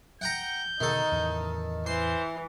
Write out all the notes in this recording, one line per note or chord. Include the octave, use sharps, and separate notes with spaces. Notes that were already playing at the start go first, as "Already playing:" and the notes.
F#5 G5 A#5 G6
B2 D3 D#3 D#4 A4
E2 A2 C#3
E3 C5 C6